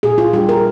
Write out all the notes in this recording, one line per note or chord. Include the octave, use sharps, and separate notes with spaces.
A#2 G#4
F4
G3 D4 F4 G4
A#4